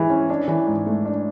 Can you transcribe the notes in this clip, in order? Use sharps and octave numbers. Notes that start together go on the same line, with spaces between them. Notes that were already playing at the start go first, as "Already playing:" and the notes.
Already playing: E3 G#3 E4
C#4
D4
E3
G#2
A3
D4